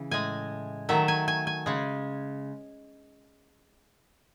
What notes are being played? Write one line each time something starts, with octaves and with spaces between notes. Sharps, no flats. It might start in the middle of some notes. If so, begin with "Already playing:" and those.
Already playing: C#3 E3
A2 G#3 G#5
D#3 F#3 A3 E5
G#5
G#5
G#5
C#3 G#3